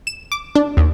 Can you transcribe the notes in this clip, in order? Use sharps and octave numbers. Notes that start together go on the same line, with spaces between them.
E7
D6
D4
D#2